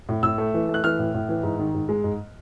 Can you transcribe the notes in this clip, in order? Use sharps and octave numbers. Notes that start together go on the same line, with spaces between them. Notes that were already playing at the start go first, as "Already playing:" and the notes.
A2
A2 E6
A3
E3
A3
F#6
E3 F6
A2
A2
E3
G#2
D#3
G#2
G#3
G#2